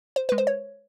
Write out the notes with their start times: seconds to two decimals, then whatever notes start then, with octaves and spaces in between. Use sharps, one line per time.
0.16 C5
0.29 G#3 B4
0.38 C5
0.47 C#5